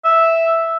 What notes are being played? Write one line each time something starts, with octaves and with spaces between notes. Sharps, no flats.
E5